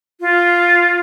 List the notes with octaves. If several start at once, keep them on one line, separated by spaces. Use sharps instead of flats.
F4